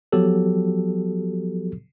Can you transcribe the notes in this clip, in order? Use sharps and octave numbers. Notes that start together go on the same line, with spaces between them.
F3 F#3 B3 F#4 G4 A4